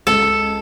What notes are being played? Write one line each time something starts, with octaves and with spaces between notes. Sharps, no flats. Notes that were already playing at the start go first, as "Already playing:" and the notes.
C#2 A4